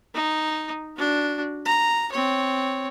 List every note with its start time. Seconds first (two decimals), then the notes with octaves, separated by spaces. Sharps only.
0.14 D#4
0.96 D4 F#4
1.65 A#5
2.12 C4 C#5